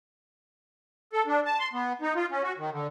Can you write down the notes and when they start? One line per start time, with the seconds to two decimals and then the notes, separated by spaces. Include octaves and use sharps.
1.13 A4
1.27 D4
1.46 A5
1.59 C6
1.73 B3
2.01 D#4
2.16 F4
2.31 C#4
2.43 F#4
2.58 D#3
2.71 D3